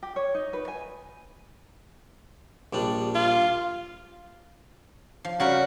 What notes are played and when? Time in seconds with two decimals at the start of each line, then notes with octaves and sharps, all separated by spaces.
0.03 G4
0.16 C#5
0.35 D#4
0.53 B4
0.68 G#5
2.73 A#1 G3 D4
3.15 F4
5.25 F3
5.40 C#3 G3 F#4 A#4